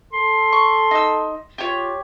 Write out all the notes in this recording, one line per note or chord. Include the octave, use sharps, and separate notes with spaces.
A4 C6
C#6
D#4 E6
F4 G4 C#5